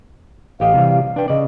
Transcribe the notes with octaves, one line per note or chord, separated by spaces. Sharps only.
A1 G4 D#5 F5
C3 E3 G3
D4 B4 G5
C#3 D5 D#5